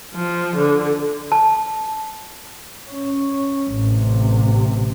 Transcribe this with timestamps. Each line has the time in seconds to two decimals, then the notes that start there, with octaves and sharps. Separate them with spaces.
0.14 F3
0.56 D3
1.32 A5
2.91 C#4
3.75 A1 C3